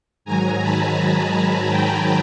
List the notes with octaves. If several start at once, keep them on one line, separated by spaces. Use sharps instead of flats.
G#2 D#3 F#3 G#5 A#5
A5 B5
G#5 A#5
G5 A5